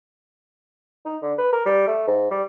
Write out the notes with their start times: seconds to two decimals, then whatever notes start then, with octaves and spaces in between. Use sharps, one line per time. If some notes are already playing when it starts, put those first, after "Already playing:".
1.05 D#4
1.22 D3
1.38 B4
1.52 A#4
1.65 G3
1.87 A3
2.07 G#2
2.30 G3